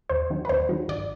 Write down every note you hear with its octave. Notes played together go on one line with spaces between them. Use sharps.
D#2 C5
D#3 F#3
B4
D#2 C5
D#3 F#3
G#1 D5